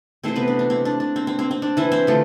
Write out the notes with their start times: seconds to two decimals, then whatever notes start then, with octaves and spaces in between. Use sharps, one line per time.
0.24 C3 E3 A3 C4 C5
0.36 B3 B4
0.48 D4
0.59 D4
0.70 C4
0.85 D4
1.00 D4
1.16 C4
1.27 C4
1.39 C4
1.51 C4
1.62 D4
1.77 E3 E4
1.92 C4 C5
2.07 D3 F3 A3